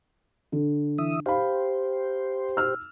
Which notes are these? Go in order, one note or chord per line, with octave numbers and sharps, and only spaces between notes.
D3
E3 E5 D#6
G4 C5 F5 B5
E6 F6